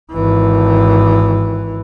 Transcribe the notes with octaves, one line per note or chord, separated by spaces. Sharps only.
G#1 E3